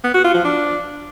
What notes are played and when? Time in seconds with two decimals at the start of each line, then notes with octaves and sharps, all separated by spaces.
0.04 B3
0.14 F#4
0.24 F4
0.35 F3
0.45 D4